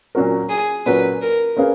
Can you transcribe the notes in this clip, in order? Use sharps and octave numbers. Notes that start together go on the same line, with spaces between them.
A#2 F#3 C#4 F#4 A#4
G#4
A#2 F#3 C#4 F#4 A#4 B4
A#4
A#3 C#4 G#4 B4 F5